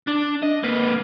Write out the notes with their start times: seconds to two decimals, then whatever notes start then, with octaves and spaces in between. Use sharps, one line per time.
0.08 D4
0.42 D#5
0.63 A#3 B4